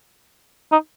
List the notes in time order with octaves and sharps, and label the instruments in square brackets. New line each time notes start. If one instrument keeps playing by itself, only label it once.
[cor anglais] D#4